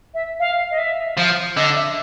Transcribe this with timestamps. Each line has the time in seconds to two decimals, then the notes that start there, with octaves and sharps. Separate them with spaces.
0.14 E5
0.40 F5
0.71 D#5
0.78 E5
1.17 F3 F5
1.57 D3 D#5
1.76 E5